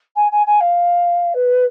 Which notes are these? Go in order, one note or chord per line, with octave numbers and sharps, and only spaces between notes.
G#5
G#5
G#5
F5
B4